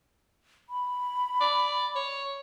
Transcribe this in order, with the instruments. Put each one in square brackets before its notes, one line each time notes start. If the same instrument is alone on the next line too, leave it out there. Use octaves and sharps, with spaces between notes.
[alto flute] B5
[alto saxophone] D5
C#5